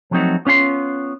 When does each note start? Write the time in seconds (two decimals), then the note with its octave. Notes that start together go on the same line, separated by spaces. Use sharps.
0.11 F3 F#3 A3 C4 D#4 F#4
0.46 B3 C#4 F4 G5 C6